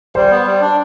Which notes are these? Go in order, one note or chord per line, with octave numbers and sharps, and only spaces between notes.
G3 C5
B3
G3
D4